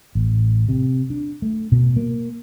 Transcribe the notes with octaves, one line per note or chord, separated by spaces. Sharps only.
A1
C3
D4
A3
B2
A#3